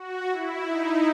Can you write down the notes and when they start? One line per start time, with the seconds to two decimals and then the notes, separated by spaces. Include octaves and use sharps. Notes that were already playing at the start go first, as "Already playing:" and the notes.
Already playing: F#4
0.31 E4
0.68 D#4